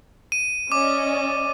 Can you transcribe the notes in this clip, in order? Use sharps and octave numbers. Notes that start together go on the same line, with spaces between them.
D#7
C#4 D5 D#5 D6